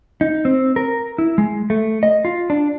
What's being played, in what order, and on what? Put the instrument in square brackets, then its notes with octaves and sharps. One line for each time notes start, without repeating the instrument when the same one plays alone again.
[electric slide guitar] D#4
C4
A#4
E4
G#3
A3
D#5
F4
D4